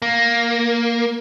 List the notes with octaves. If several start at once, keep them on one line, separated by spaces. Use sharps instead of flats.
A#3